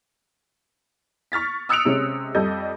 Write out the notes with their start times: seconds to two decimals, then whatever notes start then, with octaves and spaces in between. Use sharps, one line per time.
1.32 C#6 F6 A6 B6
1.69 D#6 E6 F#6 C#7 D7 F7
1.85 C3 G#3 C#4
2.35 F2 G3 A4 D#5 G6